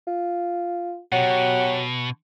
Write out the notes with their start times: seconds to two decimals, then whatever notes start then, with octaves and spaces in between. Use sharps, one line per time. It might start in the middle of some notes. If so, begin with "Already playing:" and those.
0.07 F4
1.12 B2 F#3 G4 F#5